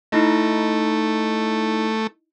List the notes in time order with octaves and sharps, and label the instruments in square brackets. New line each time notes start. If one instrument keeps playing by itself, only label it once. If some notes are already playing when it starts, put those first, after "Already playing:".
[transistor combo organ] A3 [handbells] D#4 E4 D#5